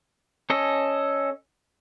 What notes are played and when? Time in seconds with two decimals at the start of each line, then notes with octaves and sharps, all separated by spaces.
0.50 C#4 A4 D#5